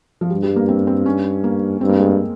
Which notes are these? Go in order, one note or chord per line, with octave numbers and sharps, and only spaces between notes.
F3
G2 G3
G3
A#3
C4
C4
C#4
A#3
G2 C4
A#3
G#3
A#3